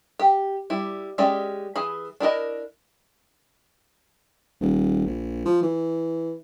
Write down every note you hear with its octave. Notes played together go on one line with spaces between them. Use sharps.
G4
G3 E4
G#3 C#4 G4 D5 E5
E3 G#4 B5
D4 E4 A#4 D#5
D#1
A#1
F3
E3